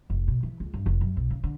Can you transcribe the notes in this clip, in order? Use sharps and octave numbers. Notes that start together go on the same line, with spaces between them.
F1
B2
E3
C#2
G2
F1
F#2
B1
C#3
D3